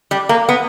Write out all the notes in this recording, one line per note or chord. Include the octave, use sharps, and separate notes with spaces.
G3
A#3
B3